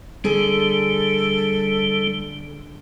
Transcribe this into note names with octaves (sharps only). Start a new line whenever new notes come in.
D3 G3 G#4 A4